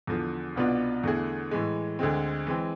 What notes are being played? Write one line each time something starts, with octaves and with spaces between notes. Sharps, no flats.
E2 D3 F3
C2 B2 B3 D4 F4
E2 D3 A3 E4 G#4
A2 E3 G#3
D2 D3 G#3 C4
E3 G#3 C4